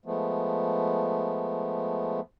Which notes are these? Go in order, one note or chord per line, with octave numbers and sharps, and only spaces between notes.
F3 G#3 A3 B3